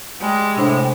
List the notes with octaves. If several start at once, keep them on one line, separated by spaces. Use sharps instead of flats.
G3 G#3
A2 C3 D4 C5